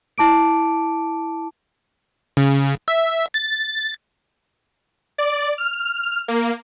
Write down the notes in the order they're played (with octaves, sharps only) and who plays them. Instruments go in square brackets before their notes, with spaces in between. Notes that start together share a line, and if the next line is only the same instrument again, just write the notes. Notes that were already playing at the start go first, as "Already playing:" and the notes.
[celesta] E4 A5 D6 D7
[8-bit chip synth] C#3
E5
A6
[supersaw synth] D5
F6
A#3